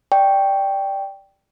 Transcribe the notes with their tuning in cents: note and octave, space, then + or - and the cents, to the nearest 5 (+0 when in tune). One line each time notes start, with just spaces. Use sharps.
D5 +0 G5 +0 C#6 +0